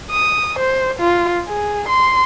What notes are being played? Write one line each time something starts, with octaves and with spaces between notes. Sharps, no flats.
D#6
C5
F4
G#4
C6